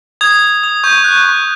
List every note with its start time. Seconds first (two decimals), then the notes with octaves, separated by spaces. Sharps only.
0.21 D#6 G#6
0.42 D#6
0.63 D#6
0.84 C#6 G6
1.04 F#6
1.25 C#6